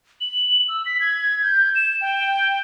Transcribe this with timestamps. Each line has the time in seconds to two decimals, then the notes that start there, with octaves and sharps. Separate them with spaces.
0.21 F#7
0.68 E6
0.86 B6
1.00 G#6
1.43 G6
1.76 E7
2.01 G5